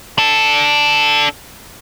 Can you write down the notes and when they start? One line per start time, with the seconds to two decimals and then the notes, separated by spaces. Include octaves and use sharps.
0.18 D4 A4